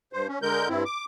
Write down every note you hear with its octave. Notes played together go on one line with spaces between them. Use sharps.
G2 C5
C#4
D3 G#3 A#4 G6
G2 C4 E4
D6